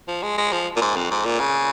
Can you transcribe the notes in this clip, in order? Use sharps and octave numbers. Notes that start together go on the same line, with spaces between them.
F3
G#3
G#3
F3
A#2
G#2
F2
G#2
A#2
C#3